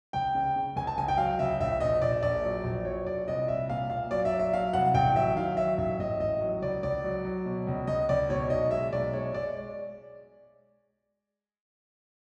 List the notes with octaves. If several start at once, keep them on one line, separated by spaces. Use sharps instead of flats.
C#2 G5
C#3
C#3
C#2 G#5
A5
C#2 G#5
G5
F#3 F5
C#2 E5
A#1 E5
A#1 D#5
A#1 D5
A#1 D5
F#3
A#1
F#3 C#5
A#1 D5
C2 D#5
C2 E5
A#2 F5
A#2 F5
F#3 D5
E5
F#3
E5
F#3 F5
C2 F#5
A1 G5
F#3 E5
D#3 F5
F#3 E5
A1 E5
G#2 D#5
A1 D#5
F#3
C#2 D5
C#2 D5
F#3
F#3
B2
C#2
C#2 D#5
C#2 D5
B2 C#5
B1 D#5
G#3 E5
B1 D5
G#3 C#5
G#3 D5